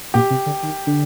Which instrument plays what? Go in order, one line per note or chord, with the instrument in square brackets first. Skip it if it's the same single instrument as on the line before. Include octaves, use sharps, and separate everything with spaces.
[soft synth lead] A#2 [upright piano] G4
[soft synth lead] C3
D3
D#3
D3